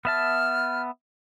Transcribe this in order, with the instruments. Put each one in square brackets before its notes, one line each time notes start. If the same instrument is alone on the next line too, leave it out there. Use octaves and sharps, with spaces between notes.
[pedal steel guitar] B3 E5 A5 [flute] F6